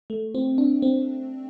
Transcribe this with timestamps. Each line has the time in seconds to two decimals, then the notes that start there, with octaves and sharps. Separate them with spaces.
0.10 A3
0.35 C4
0.58 D4
0.82 C4